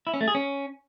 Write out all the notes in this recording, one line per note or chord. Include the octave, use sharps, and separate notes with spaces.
E4
C#4
A3
G#4
C#4